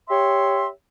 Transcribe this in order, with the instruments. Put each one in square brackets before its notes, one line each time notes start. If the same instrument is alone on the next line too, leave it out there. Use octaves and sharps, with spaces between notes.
[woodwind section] G4 C#5 E5 C6